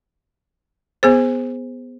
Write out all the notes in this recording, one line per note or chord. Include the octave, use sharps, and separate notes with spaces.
B3 G#4 C5